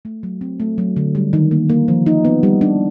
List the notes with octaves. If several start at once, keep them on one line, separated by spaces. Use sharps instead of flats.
A3
F#3
C4
A3
F#3
D3
G3
D#3
A#3
A#3
F3
D#4
B3
G3
D4